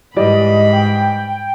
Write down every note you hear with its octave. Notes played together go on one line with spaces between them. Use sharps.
G#2 E3 G3 D5 D#5 B5
G5